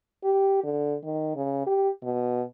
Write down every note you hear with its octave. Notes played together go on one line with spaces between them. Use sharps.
G4
D3
D#3
C#3
G4
B2